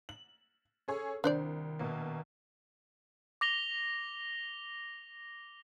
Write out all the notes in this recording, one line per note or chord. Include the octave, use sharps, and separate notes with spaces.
F#7
C#4 G#4 A4 C#5
C2 D#3 D4 C5 D5
A#1 B2 A#3
D6 A#6 F7 G7